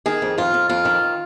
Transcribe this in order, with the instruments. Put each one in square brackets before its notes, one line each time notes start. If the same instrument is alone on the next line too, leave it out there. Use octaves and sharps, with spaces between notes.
[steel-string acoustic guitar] D#3 G#4
F2
F2 F4
F2
F2 F4
D#3